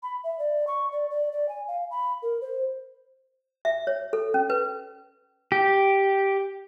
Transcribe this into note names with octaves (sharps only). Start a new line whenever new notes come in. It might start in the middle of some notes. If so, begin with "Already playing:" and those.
B5
E5
D5
C#6
D5
D5
D5
G#5
F5
B5
A#4
C5
E5
C#5
A4
C#4
B4
G4